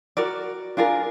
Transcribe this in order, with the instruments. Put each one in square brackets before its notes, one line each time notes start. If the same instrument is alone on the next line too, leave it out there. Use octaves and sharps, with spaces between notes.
[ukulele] F#4 A#4 D5
D4 F4 G#4 A#4